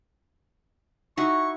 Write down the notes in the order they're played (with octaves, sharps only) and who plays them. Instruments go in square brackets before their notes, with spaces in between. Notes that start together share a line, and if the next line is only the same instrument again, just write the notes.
[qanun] D#4 E4 F#4 [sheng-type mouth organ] C#6